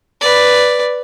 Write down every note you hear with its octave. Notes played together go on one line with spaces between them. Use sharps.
B4 D5